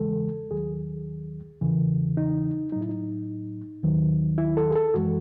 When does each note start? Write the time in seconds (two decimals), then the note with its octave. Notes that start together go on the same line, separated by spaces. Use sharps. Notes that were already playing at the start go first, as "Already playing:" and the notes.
Already playing: E2 C#3 E3 G#3 A4
0.51 D#2 D#3 F#3 G#4
1.61 E2 C#3 E3
2.17 D#4
2.72 A2 F#3 D#4
2.81 E4
2.89 D#4
3.83 D#2 D#3 F#3
4.38 E4
4.57 A4
4.71 G#4
4.75 A4
4.94 F#2 E3 G#3 F#4